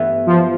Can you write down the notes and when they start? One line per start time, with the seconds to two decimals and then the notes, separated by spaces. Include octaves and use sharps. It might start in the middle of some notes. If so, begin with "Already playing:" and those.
Already playing: G2 E3 B3 E4
0.27 F3